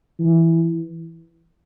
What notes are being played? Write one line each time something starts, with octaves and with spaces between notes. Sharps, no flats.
E3